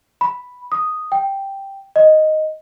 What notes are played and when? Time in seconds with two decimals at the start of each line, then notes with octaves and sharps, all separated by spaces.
0.21 B5
0.72 D#6
1.12 G5
1.96 D#5